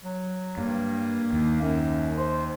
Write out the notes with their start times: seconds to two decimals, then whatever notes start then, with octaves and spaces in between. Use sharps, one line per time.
0.04 F#3
0.58 G2 A#3
1.33 D#2
1.61 F#2
2.18 C5